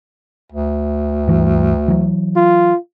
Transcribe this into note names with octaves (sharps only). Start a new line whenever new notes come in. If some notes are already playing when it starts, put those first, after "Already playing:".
D2
G2 E3
E3 F#3
F4